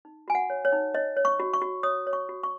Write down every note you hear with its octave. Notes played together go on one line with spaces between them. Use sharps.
D#4
F#4 G#5
F#5
C#5
C#5
D#4
C#5 D#5
C#5
C#6
F#4
C#6
F#4
C#5 D#6
C#5
C#6
F#4
C#6